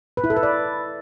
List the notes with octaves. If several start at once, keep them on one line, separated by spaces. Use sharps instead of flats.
B4
E4
A4
B4
D5